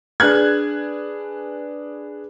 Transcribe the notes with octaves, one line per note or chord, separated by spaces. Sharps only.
D4 G#4 B4 F#6 G#6